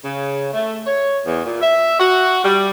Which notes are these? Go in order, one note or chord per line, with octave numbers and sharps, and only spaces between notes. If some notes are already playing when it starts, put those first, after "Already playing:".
C#3
A3
C#5
E2
A#2
E5
F#4
G3